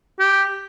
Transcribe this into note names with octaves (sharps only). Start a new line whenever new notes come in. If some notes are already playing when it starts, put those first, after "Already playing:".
G4